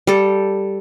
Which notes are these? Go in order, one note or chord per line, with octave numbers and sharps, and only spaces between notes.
G3 A4